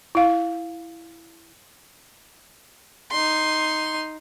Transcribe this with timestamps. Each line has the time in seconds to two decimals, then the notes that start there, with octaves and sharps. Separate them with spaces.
0.15 E4 F5
3.11 D#4 C6